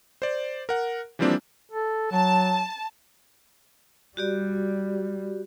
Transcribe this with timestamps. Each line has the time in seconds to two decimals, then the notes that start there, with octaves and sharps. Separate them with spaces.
0.22 C5 D5
0.69 A#4 F#5
1.19 E3 F3 G3 A#3 C4 D4
1.72 A4
2.12 F#3 A5
4.17 G3 F#4 G4 D5